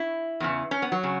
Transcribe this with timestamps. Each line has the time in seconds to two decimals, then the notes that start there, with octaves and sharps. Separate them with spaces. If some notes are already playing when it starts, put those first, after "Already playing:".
Already playing: E4
0.40 E2 C#3 E3
0.71 C#4
0.82 B3
0.92 F#3
1.03 C#3